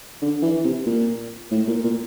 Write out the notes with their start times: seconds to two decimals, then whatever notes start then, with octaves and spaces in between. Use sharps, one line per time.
0.22 D3
0.43 E3
0.65 C3
0.87 A#2
1.52 A2
1.68 A#2
1.84 A#2